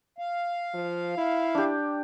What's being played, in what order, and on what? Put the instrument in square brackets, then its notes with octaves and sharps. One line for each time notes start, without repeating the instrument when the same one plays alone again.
[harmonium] F5
[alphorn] F3
E4
[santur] D4 G4